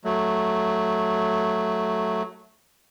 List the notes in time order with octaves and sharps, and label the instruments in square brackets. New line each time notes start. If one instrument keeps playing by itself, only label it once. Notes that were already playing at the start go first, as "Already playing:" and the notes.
[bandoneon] F#3 A3